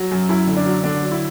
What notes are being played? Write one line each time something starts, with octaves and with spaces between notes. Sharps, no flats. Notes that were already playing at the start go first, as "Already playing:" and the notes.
Already playing: F#3
F#2
F#2 E4
D3
D4
F#3
D3 D4
F#3
E4